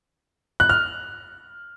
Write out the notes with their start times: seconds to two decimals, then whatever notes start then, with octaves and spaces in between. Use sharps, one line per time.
0.60 F#6
0.69 F6